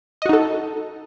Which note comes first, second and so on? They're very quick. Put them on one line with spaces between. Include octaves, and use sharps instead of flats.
D#5 F#4 D#4 A4